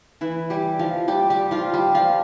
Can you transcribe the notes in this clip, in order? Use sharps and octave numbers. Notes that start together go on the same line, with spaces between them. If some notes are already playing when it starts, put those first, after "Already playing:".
E3 E4
G3 G4
F3 F4
G3 G4
G3 G4
F3 F4
G3 G4
F3 F4